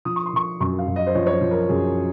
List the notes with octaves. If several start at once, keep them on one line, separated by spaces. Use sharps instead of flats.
F3 D#6
C#6
C6
F3 C#6
F#2 C#6
F5
F#2
D#5
C5
F3 C#5
C#5
C5
F3
A#4
F#2 G#4